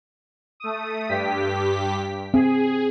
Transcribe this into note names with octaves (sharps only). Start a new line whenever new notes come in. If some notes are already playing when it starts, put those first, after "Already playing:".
A3 D#6
G2 G4 B6
C4 G#4